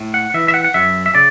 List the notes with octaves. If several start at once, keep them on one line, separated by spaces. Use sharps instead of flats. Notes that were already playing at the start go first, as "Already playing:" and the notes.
Already playing: A2
F#5
E3 E5
E5
F#5
F#5
F#2 E5
E5
C#3 D5